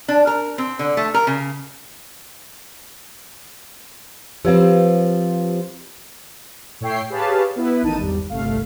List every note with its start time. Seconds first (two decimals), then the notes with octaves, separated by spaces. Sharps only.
0.08 D4
0.27 A#4
0.58 C4
0.79 D3
0.97 A3
1.14 A#4
1.27 C#3
4.45 F3 C4 G4 B4 F5
6.81 A2 C#5 E5 G5 C7
7.10 G4 G#4 B4 C#5 F5 A5
7.56 B3 E4 B4
7.82 A1 D#3 D#4 A5 D#7
7.98 G#1 E2 G3
8.30 G1 C2 A3 F5